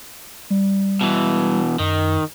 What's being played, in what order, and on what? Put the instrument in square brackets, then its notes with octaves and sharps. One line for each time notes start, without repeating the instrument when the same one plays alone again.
[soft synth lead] G3
[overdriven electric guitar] B2 E3
[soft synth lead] F#2 [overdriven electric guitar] D#3